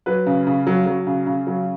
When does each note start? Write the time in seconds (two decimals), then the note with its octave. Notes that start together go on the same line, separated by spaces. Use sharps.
0.06 F#3 B4
0.26 C#3
0.47 C#3
0.67 F#3
0.86 F#3
1.07 C#3
1.27 C#3
1.47 F#3